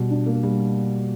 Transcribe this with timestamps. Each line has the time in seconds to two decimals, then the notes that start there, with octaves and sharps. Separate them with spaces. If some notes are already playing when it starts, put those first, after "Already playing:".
Already playing: B2 G3
0.10 D4
0.26 A#3
0.43 G3